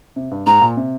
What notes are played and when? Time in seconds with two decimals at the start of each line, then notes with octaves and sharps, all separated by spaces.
0.16 C3
0.31 G2
0.46 G#2 A#5
0.61 A#2
0.77 C3